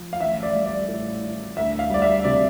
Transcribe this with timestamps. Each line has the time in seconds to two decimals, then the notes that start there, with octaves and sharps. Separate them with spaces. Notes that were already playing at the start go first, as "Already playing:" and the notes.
Already playing: F3
0.13 F5
0.20 A1 E5
0.43 D5
0.55 G3
0.66 D5
0.88 A2
1.22 E3
1.57 D2 E5
1.79 F5
1.90 G3 D5
2.02 E5
2.24 C3 D5